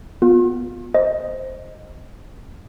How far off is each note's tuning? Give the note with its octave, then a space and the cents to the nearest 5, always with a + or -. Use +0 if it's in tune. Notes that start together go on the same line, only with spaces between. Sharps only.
B3 +0 F4 +25
C5 +0 D#5 +0